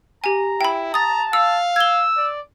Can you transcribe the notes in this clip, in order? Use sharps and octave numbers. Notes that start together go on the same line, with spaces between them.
G4 G#5 A#5
E4 G5 B5
A5 A#5 D#6 A6
F5 E6
E6 G#6 G7
D5